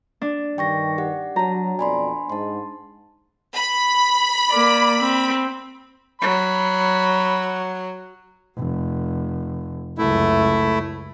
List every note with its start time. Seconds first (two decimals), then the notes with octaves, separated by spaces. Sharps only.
0.22 D4
0.58 G2 D#3 G5 C#6 A#6
0.98 G4 F#5
1.36 F#3 F#4 A5 A#5
1.79 F2 B2 D5 G#5 B5 C6
2.30 G#2 A5 C6
3.56 B5
4.50 A#3 D5
4.99 C4
6.21 F#3 B5
8.57 F1
9.98 C#2 F#2 A3 E4